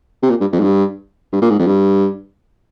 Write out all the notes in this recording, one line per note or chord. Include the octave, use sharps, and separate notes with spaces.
C3
A#2
G2
F2
G#2
G2
G2
A#2
G#2
F2
G2